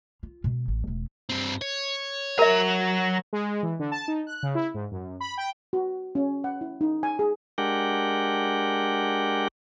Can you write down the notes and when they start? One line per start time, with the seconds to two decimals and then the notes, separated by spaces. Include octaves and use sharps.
0.23 F4
0.44 B2 G#3
0.68 A1
0.87 E1 A3
1.29 G2 C4
1.61 C#5
2.39 F#3 A#4 E5 A#5
3.33 G#3
3.63 E3
3.79 D3
3.91 A5
4.08 D#4
4.27 F#6
4.43 C#3
4.55 E4
4.74 G#2
4.91 F#2
5.20 B5
5.37 G5
5.73 F#4
6.15 C#4
6.44 F#5
6.61 E4
6.81 D#4
7.03 G#5
7.19 G#4
7.58 G#3 D4 G4 A#4 F#5 G5